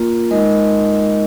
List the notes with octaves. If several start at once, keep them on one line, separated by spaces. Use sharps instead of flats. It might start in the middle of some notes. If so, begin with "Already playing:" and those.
Already playing: A#3 F4 A#4
G#3 D#4 A#4 D#5